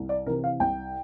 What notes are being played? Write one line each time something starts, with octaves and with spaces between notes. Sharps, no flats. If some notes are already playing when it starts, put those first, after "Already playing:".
Already playing: C2
D5
C3 E3 A#4
F5
C2 G5